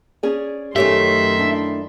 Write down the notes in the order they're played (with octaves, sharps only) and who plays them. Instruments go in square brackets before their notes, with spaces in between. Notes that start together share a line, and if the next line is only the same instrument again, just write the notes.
[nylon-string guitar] C#4 G#4 D5
[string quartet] F#2 D#3 C6 [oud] A3 C#4 A4 [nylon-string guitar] G4 [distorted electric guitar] E5
[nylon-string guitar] D4 E4